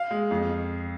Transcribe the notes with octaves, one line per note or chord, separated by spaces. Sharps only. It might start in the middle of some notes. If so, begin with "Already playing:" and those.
Already playing: F5
G#3
F2